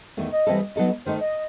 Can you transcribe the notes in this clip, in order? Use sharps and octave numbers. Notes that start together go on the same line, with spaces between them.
E2 D#3 A3
D#5
E3 G3 C4 E4 A4
F#3 B3 D#4 A4 D#5
D#3 A3 D#4 C5
D#5